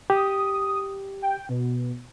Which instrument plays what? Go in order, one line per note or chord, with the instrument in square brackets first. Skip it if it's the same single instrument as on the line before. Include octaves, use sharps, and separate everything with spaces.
[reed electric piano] G4 [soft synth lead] D#6
[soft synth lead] G5
B2